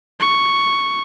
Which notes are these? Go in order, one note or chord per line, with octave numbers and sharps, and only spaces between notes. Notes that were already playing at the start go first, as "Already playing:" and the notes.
C#6